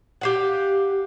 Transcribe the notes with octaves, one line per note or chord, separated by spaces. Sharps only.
G4 F5 F#5